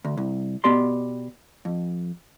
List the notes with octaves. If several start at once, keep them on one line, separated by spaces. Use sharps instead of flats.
D2
C2
B2 B3 G4 D5 C6
F2